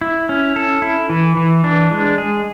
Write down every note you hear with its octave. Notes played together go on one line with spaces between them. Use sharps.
E4
C#4
A4
E4
E3
E3
D4
G#3
G#4